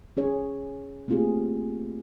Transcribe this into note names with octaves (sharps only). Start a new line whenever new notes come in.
C#4 G#4 C#5
A3 A#3 C4 F4 G4 G#4